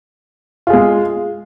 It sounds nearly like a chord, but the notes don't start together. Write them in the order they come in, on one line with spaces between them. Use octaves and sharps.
F4 G#4 G#3